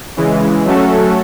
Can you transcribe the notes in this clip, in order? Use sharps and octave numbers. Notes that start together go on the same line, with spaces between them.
C#3 E3 G#3
F#3 A3 C#4 F#4 A4